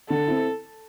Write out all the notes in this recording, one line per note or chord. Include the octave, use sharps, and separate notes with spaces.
D3 A4
C4 E4